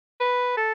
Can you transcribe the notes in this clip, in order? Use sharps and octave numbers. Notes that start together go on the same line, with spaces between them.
B4
A4